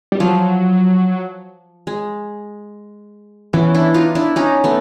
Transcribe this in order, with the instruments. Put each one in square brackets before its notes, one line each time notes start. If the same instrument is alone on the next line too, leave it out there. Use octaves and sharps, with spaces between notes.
[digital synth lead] G3
[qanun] F3 [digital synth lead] F#3
[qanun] G#3
[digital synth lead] E3 [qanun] B3 C#4
[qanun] D4 E4
D#4 F4
D4 E4
C#4 D#4
A3 B3